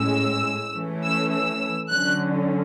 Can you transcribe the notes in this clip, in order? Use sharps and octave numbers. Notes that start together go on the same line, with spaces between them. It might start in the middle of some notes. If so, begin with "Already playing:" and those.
Already playing: A2 G#3 C#4 E6
E3 A3 C#4
E6
E6
D3 F#3 C#4 F#6